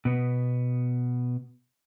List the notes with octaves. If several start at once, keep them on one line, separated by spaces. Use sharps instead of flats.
B2 B3